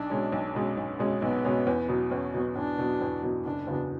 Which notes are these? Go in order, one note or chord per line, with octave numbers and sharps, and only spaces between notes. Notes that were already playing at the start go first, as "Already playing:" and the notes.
Already playing: B1 D4
B2 G#3 C#4
B1
B2 G#3 C#4
B1
B2 G#3 C#4
B1 B3
B2 G#3 C#4
E2
B2 F#3 B3
E2 C#4
B2 F#3 B3
E2 D4
B2 F#3 B3
E2
B2 F#3 B3
F#1 D4
E2 C#3 F#3 B3